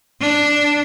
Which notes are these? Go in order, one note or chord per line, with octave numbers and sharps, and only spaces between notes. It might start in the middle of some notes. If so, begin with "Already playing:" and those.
D4